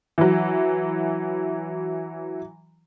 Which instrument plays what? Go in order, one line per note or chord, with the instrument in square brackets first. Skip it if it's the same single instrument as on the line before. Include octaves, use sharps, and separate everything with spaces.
[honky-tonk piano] E3 F#3